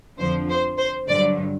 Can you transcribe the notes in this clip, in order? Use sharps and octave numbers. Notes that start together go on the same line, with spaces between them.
F2 D3 F3 C5
C5
C5
G2 D3 F#3 D5